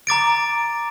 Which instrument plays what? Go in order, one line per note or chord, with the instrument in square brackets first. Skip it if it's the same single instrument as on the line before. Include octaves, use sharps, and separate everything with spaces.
[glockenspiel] A#5 D6 A6 D7